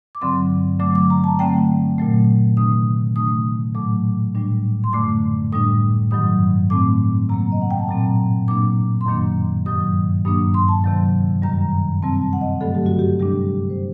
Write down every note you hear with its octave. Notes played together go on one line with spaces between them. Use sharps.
D6
G2 D3 F#3 C4 C6
D3 F#3 A3 D6
D6
A#5
A5
D3 F#3 A3 C4 G5
A#2 F#3 A3
C3 D#3 A3 D4 D#6
C3 D#3 A3 D4 D#6
A2 F#3 A3 D6
A2 G3 D4
C6
F#2 D3 A3 D6
A2 G3 D4 D#6
G2 D#3 F#3 D#6
A2 A3 C4 D6
C3 F#3 A#3 A#5
D#5
F#5
G5
A5
A#2 F#3 C4 A#5
A#2 F#3 A#3 D4 D6
C6
F#2 D#3 F#3 A#3 D4 D6
G2 D#3 F#3 D#6
G2 F#3 A#3 D4 D#6
C6
A5
C3 D#3 F#3
F#2 D#3 G3 A#5
C3 G3 C4 A5
A5
F#5
D#5
G2 D3 F#3 A3 A4
G4
F#4
G4
C3 G3 D4 G4
C5